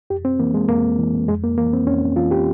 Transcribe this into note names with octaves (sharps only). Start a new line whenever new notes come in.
F2 G4
C4
E3 A#3
G#3
F2 A#3
E3
F2 G#3
A#3
E3 A#3
C4
F2 C#4
E3 F4
G4